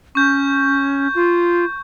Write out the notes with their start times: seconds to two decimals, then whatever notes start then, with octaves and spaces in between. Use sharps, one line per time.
0.15 C#4 C#6 G6
1.15 F4